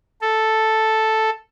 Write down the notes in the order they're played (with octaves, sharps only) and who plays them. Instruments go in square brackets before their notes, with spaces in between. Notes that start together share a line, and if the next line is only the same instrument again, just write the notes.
[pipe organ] A4